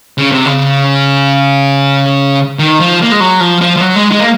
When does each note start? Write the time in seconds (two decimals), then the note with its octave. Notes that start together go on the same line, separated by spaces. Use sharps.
0.18 C#3
0.32 C3
0.46 C#3
2.59 D#3
2.80 F3
3.03 A#3
3.11 G#3
3.20 F#3
3.40 F3
3.61 F3
3.76 F3
3.81 F#3
3.96 G#3
4.11 G#3
4.19 A#3